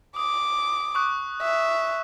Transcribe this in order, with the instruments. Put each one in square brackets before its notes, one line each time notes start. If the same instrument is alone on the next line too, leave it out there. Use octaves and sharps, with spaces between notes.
[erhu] D6 [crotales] D#6
[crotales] C#6 D#6 F#6
[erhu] E5